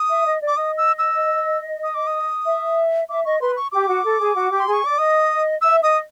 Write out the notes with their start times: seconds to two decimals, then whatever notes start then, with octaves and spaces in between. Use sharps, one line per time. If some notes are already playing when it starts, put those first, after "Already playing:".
Already playing: D#6
0.09 E5
0.24 D#5
0.41 D5
0.48 D6
0.57 D#5 D#6
0.78 E6
0.99 E6
1.83 D#6
1.94 D6
2.07 D#6
2.46 E5
3.09 E5 D6
3.25 D#5 C#6
3.41 B4 C6
3.57 C#6
3.72 G4 D6
3.88 F#4
4.04 A4
4.20 G#4
4.36 F#4
4.51 G4
4.60 C6
4.67 G#4
4.73 C#6
4.83 D5 D6
4.98 D#5 D#6
5.62 E5 E6
5.82 D#5 D#6